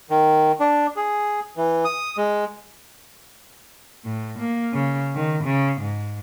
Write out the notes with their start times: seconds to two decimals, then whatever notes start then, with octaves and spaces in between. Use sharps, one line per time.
0.10 D#3
0.60 D4
0.96 G#4
1.57 E3
1.85 D#6
2.17 G#3
4.05 A2
4.39 A#3
4.74 C#3
5.15 D#3
5.44 C#3
5.82 G#2